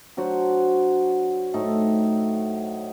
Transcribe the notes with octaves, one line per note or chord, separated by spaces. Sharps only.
F#3 D4 F#4 C5
A2 A3 D#4